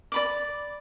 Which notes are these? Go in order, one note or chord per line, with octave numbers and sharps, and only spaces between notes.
D5 B5 D6